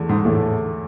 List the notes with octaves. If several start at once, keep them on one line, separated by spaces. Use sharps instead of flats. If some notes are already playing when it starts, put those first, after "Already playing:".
Already playing: E2 D3 A3
G#2
E2 A2 D3 A3